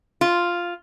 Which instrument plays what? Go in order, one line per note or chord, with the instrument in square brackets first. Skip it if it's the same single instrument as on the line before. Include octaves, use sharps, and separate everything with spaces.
[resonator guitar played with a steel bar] F4